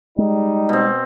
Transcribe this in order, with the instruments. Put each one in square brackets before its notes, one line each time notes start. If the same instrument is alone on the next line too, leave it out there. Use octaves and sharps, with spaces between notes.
[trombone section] G3 D#4 [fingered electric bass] G#3
[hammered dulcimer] B2 C4